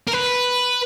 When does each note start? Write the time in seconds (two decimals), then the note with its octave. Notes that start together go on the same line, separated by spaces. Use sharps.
0.07 A#4
0.13 B4